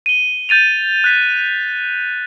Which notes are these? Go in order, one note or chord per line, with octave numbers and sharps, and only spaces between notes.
D#7 G7
G6 A6 D#7 F7
F#6 B6